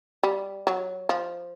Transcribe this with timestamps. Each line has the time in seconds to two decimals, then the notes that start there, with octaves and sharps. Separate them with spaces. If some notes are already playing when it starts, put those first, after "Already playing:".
0.23 G3
0.67 F#3
1.09 F3